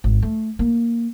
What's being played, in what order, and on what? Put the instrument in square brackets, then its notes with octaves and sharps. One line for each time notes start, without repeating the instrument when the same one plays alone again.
[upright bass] G#1
A3
A#3